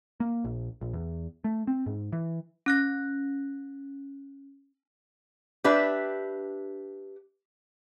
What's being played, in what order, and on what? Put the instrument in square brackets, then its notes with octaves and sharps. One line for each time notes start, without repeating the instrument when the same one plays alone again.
[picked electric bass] A#3
A#1
A#1
E2
A3
C4
G#2
E3
[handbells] C#4 F#6 A#6
[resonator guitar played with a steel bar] D4 G4 B4 E5